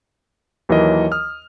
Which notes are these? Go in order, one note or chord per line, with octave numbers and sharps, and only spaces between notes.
D#2 E3 F#3 A#4 D#5
D#6 F6